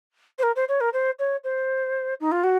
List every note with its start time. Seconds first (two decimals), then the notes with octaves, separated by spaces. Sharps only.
0.39 C5
0.43 A#4
0.56 C5
0.68 C#5
0.80 A#4
0.93 C5
1.19 C#5
1.44 C5
2.20 D#4
2.31 F4
2.43 F#4